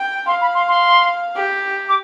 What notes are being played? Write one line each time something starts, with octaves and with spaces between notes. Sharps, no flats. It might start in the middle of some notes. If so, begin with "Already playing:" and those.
Already playing: G5
F5 C6
B5
C6
C6
G4
D6